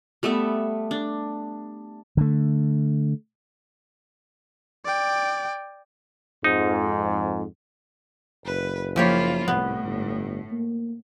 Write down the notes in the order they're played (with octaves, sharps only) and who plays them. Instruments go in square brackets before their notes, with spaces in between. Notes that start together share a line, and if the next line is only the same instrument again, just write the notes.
[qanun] G3 A3 B3 E5
D4
[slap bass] D3 A3
[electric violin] D5 G5
[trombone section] F2 G#2 [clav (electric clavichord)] D#4
[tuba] F#1 [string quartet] B4
[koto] F3 G4 C#5 [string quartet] A#3 E4 F4
[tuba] C2 [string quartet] A2 [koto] B3
[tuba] G1
A#3